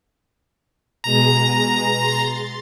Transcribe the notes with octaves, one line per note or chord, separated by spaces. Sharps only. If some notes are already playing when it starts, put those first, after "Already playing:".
B2 G#3 G#4 A#5
C6 A6